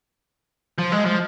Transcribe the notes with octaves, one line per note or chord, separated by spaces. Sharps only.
F3
G#3
F3